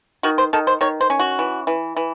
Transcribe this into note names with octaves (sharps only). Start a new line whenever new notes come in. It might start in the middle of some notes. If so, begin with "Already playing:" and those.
D#3 F#4
C5
D#3 A4
C5
D#3 C#5
C5
C#4
F#4
E3
E3
E3